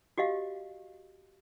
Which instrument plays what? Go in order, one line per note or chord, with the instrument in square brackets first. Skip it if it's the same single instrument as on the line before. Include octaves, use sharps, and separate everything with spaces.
[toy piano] F#4 G4 D#5 F5